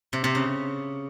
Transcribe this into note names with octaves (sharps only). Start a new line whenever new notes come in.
C3
C3
C#3